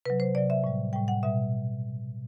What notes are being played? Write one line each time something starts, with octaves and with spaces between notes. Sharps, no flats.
C3 F#3 B4
C5
C3 F#3 D5
E5
A2 G3
A2 G3 G5
F#5
B2 G3 E5